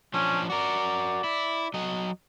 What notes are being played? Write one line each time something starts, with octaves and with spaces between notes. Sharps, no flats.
F3 C#4 D4
F#4 A#4 D5
E4
F#3 D#5